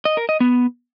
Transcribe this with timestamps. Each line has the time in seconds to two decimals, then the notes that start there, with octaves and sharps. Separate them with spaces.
0.05 D#5
0.17 A#4
0.29 D#5
0.40 B3